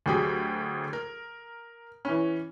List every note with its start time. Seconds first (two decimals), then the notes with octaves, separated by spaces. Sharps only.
0.06 D2 F#3 G4 G#4 G5
0.93 A#4
2.05 E3 C#4